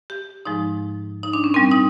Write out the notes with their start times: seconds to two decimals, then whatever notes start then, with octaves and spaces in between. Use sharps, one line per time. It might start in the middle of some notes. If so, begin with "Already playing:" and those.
0.10 G4
0.45 G#2 F3 G#3 D#4
1.23 D#4
1.33 D4
1.44 C#4
1.54 A#2 G3 C4
1.71 D#4